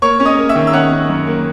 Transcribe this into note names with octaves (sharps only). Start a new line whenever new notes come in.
A#3 C#5 C#6
C#4
D#5 D#6
A#3
E5 E6
D#3
E6
C#4 F#5 F#6
C#4
F#2
A#3